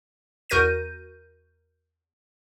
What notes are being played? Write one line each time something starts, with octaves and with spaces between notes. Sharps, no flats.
E2 F#4 A#4 G6 A#6 D#7